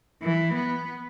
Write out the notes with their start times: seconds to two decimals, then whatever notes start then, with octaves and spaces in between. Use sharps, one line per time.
0.22 E3
0.54 B3